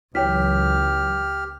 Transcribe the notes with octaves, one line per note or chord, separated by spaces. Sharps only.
C#2 E3 F#3 G4 C#5 G5 F6 B6